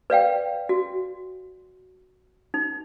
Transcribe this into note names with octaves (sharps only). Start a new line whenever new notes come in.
B4 D5 F5 G5
F#4
D#4